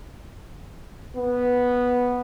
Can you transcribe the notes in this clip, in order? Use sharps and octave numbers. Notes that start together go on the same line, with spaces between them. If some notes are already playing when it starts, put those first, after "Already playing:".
B3